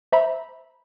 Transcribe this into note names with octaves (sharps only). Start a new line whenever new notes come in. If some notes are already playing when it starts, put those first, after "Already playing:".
C5 E5 A#5 B5